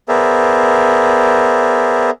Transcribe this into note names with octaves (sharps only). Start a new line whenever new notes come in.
B3 G#4 A#4 C5 D5 E5